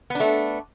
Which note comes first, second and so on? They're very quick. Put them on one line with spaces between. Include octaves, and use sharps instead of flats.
B3 D4 A3